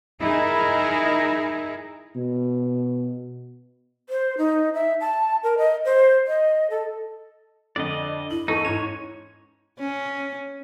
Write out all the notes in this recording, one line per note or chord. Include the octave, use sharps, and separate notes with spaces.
D#4 E4 G#4 A#4
B2
C5
D#4
E5
A5
A#4
D#5
C5
D#5
A4
F2 D3 D5 D#5
E4 F#7
E2 D#4 A4 C#6
G#2 C#4 C#5 D#7
C#4